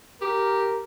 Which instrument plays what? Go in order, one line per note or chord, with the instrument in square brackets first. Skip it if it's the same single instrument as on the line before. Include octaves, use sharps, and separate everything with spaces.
[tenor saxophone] G4 [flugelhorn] A#4